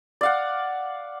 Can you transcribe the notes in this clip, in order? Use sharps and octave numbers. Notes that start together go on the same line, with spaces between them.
D5 F5 F#5